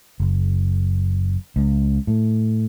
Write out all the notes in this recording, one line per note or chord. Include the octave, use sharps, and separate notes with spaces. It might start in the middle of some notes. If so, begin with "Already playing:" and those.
F#1
C#2
A2